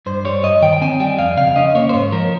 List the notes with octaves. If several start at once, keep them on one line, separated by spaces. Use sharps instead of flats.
G2 C5
G3 C#5
G2 D#5
D#3 G5
G5
C4 G#5
G3 G5
F2 F5
C#3 F5
C#4 D#5
A#3 C#5
C5
G#2 C#5
F3 A#4